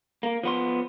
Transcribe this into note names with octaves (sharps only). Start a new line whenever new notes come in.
A#3
F3 B3 C6